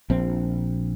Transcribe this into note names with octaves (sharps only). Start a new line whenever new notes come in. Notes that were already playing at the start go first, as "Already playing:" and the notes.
A#1 C4